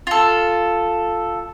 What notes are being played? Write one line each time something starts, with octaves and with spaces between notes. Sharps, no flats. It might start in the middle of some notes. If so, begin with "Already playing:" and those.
F4 A4